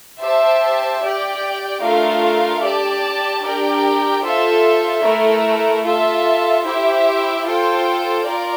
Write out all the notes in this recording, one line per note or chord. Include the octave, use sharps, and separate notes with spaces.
G4 C5 E5 A5
G4 D5 G5
A3 D4 F4 A#4 F5
G4 D5 A5
D4 G4 A#4 D5 G5
F4 A4 C5 E5
A3 E4 A#4
F4 A4 E5 A5
E4 G4 C5 E5
F4 A4 C5 G5
F4 A#4 D5